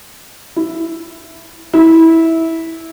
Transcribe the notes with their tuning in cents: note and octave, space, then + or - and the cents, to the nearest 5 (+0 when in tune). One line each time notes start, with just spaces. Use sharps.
E4 +5
E4 -15